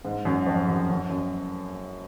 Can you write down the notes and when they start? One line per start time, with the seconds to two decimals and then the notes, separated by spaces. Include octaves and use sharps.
0.05 G#2
0.25 F#2
0.46 F2
0.68 F#2
0.89 F#2
1.10 F#2